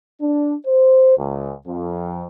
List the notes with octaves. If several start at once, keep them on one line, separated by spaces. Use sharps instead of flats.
D4
C5
C#2
F2